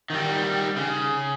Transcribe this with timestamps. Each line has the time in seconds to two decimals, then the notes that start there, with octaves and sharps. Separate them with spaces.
0.10 D#3 G3
0.76 C#3